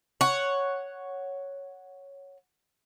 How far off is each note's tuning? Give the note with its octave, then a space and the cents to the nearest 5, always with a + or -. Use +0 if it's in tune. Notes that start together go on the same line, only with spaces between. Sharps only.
C#5 +0 F#5 +0